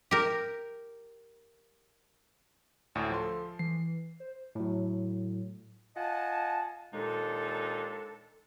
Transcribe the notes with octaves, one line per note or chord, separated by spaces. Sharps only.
G4 A#4
D2 A2 D5
F3 A4 C6
E3 C7
C5
A2 F#3
F4 D#5 F#5 G#5 A5
D#2 A#2 G#3 D4 D#4 A4